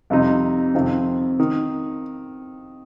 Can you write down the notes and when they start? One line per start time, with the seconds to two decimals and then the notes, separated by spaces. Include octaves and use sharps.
0.10 F2 C3 G3 D#4
0.75 F2 C3 D#3 C4
1.40 D#3